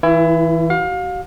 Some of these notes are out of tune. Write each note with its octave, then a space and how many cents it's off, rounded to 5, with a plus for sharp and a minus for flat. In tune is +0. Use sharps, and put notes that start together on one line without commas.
E3 -20 E4 +30
F#4 +40 F5 +30